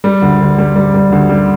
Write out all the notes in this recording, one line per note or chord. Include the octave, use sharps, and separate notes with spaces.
G3
D2
D2
G3
G3
G3
D2
G3